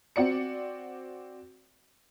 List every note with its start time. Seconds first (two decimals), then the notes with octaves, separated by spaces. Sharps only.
0.16 C4 F#4 D5 C#7